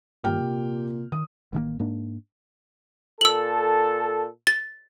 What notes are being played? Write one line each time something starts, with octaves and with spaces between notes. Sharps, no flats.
G1 G2 A#2 D#3 G4 G5 F6
C3
D#3 D#6
A1 D#3 F3 A#3
G#2 A#3 D4
A#2 A4 E6 F#7
A6